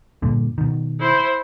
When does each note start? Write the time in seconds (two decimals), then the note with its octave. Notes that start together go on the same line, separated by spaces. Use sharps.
0.22 G2 A#2 D3
0.58 B2 D#3
1.00 E4 C5